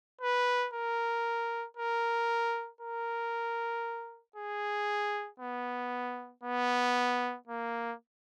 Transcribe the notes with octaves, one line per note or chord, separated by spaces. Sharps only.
B4
A#4
A#4
A#4
G#4
B3
B3
A#3